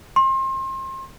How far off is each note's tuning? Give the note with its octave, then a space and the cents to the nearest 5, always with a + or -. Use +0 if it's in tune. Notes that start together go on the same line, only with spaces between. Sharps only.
C6 +35